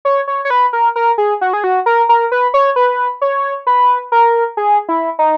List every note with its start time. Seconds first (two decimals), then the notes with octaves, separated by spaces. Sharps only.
0.05 C#5
0.28 C#5
0.45 C#5
0.50 B4
0.73 A#4
0.96 A#4
1.18 G#4
1.41 F#4
1.53 G#4
1.64 F#4
1.86 A#4
2.09 A#4
2.32 B4
2.54 C#5
2.76 B4
3.22 C#5
3.67 B4
4.12 A#4
4.57 G#4
4.89 E4
5.19 D#4